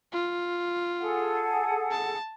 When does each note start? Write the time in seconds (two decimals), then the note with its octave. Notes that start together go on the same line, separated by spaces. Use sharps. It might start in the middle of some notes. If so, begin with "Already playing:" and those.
0.13 F4
0.99 G#4 A4 F#5
1.91 A5